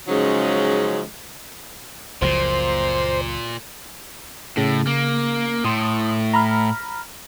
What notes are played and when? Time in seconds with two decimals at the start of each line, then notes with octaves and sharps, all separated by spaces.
0.08 C#3 F3 F#3 G#3 C#4 D#4
2.22 F#1 C#2 A#2 F3 C5
4.57 A2 C#3
4.87 A#3
5.65 A2 C6 D#6
6.34 A#5 B5 F6